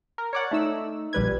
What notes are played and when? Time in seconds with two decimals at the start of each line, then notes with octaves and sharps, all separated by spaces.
0.18 A#4
0.33 C#5 D5 F#5
0.51 A3 D#4 E6
1.13 A#1 G3 B4 G#6